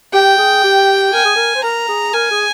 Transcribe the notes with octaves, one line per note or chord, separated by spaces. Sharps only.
G4 G5
G#4
G4
A#4 G#5
G#4
A#4
C5
A#4 A#5
G#4
A#4 G#5
G#4